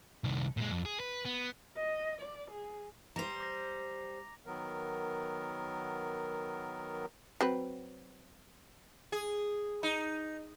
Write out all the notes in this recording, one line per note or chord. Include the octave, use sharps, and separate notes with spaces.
C2 D#3
A#2 G#3
F2
G#4
B4
B3
D#5
D5
G#4
G3 C5 A#5 A#6 F7
D6 A#6
D#3 F#3 B3 A#4
F#3 C4 B4
G#4
D#4